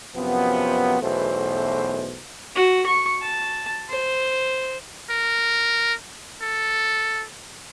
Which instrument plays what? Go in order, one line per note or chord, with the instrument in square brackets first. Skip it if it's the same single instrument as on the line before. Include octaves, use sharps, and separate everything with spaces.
[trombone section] F#2 C3 F3 B3
B1 E2 B2 A3 C5
[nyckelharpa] F#4
C#6
A5
C5
[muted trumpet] A#4
A4